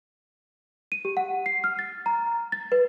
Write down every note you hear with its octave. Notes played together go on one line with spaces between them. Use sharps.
D#7
G4
F#5
C7
F6
A6
A#5
A6
B4